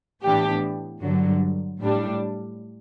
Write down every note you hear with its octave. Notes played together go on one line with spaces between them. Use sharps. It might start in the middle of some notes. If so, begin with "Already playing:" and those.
A2 E3 B3 D4 G4
G2 D3 F#3
A2 G3 D4